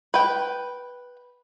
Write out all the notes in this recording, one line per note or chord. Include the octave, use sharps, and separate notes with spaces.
B4 G5